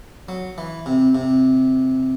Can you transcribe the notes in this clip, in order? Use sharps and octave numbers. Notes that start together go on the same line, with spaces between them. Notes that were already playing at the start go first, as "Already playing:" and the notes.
F#3
E3
C3
C3